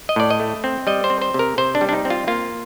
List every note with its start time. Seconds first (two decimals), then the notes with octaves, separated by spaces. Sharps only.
0.09 D#5
0.16 A2 D5
0.30 D#5
0.40 A3
0.64 C4
0.87 G3 D#5
1.04 C5
1.10 C4
1.22 C5
1.34 C3 A#4
1.58 C3 C5
1.75 D4
1.81 G3
1.89 D4
1.93 D#4
2.05 C4
2.10 F4
2.27 A#3 F4